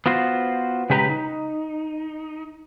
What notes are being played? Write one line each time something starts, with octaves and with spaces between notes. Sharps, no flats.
B3 F4 F#4 C5
C#3 G#3 G4 B4 A5 A#5
D#4